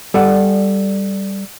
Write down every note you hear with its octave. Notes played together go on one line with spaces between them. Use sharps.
G3 A4 D5 F#5